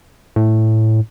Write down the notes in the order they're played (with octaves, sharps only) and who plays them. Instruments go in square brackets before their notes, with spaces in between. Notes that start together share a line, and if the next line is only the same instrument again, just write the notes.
[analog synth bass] A2